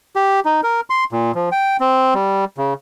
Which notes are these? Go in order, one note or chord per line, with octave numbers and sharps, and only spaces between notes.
G4
D#4
A#4
C6
A#2
F3
G5
C4
G3
C#3